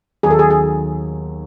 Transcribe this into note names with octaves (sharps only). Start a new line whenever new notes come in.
D#2 D#3 F#3 B3 G#4
A4
G#4
G#4